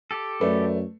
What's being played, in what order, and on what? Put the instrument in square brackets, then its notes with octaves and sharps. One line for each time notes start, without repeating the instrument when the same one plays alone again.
[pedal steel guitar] G4 A4
[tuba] F#2 [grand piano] A3 [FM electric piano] B4 D5